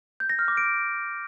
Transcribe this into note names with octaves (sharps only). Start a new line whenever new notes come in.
G6
A#6
F6
D6
D7